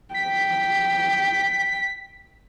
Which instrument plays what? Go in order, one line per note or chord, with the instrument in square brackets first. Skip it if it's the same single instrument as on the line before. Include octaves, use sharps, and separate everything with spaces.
[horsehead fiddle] G5 [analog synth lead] B6